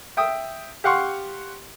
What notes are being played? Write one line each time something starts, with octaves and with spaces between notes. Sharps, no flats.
E5 G5 D#6
G4 F5 F#5 C6 C#6